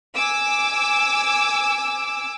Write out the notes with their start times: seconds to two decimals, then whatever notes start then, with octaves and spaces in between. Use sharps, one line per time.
0.16 G#5 D6 E6